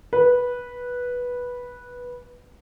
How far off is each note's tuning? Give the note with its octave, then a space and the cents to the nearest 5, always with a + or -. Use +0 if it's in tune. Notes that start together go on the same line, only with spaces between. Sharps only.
B4 -10